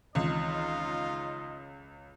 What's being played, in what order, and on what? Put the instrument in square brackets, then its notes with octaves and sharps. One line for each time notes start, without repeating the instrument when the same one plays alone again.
[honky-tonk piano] C#2 [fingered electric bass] D#3 E3 C4 [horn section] D#4 F4 [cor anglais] D#5